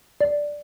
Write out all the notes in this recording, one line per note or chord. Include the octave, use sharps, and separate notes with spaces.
D5